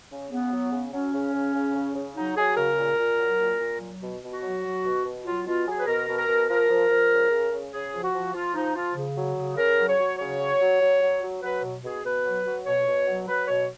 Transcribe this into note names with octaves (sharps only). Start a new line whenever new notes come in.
C#3
C#3 B3
F#3
C#3
F#3 C#4
C#3
C#3
C#3
C#3
C#3
F#3 D#4
F#3 G#4
C#3 A#4
A#2
A#2
F#3
A#2
A#2
F#3
B2
B2
F#4
F#3
F#3
B2
B2
F#3 F4
B2 F4
F#3 G#4
B4
B2 A#4
B2
A#4
B2
F3 A#4
F3
F3
C#3
C#3
C#3
C#3 G#4
F3
F#4
F3
F3 F4
F3 D#4
F3 F4
C#3
F#3
C#3
C#3 A#4
F#3
C#5
F#3
C#3 C#5
F#3
F#3
F#3
F#3
F#3
F#3 B4
B2
B2 G#4
B2 B4
F#3
F#3
B2 C#5
B2
F#3
F#3 B4
B2 C#5